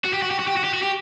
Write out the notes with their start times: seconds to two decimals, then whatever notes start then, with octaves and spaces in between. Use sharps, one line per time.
0.05 F#4
0.14 G4
0.22 F#4
0.31 G4
0.39 F#4
0.48 G4
0.57 F#4
0.64 G4
0.73 F#4
0.82 G4